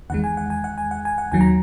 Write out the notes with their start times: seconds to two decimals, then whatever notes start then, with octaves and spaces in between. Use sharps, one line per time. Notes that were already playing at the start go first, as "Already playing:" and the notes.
0.10 E2 D#3 G#3 F#5
0.24 G#5
0.37 F#5
0.50 G#5
0.64 F#5
0.78 G#5
0.91 F#5
1.05 G#5
1.18 F#5
1.32 D#2 D#3 F#3 G#5
1.41 A#5